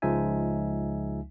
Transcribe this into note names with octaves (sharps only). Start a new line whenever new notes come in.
C#2 F3 G#3 D#4 E5 G#5